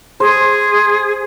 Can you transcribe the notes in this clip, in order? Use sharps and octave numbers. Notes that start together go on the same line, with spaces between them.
G#4 C5